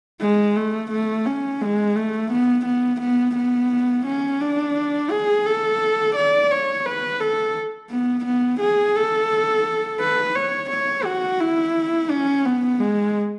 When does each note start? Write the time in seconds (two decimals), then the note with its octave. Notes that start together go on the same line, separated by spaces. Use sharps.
0.21 G#3
0.57 A3
0.92 A3
1.26 C#4
1.62 G#3
1.96 A3
2.32 B3
2.66 B3
3.01 B3
3.36 B3
4.06 C#4
4.41 D4
5.11 G#4
5.46 A4
6.16 D5
6.51 C#5
6.86 B4
7.20 A4
7.91 B3
8.25 B3
8.61 G#4
8.96 A4
10.00 B4
10.36 C#5
10.70 C#5
11.05 F#4
11.41 E4
12.10 C#4
12.45 B3
12.80 G#3